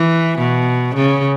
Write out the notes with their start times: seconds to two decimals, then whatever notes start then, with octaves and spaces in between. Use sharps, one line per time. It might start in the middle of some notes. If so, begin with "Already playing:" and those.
Already playing: E3
0.38 B2
0.95 C#3